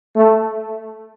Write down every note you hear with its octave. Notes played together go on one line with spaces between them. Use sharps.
A3